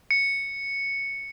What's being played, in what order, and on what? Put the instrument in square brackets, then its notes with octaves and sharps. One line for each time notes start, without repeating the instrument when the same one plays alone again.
[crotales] C#7